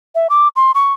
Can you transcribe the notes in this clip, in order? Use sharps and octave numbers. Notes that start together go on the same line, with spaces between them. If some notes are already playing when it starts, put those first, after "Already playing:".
E5
D6
C6
C#6